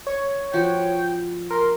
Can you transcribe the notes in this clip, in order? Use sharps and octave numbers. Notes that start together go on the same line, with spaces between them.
C#5
F3 F#4 G5
A#4 C6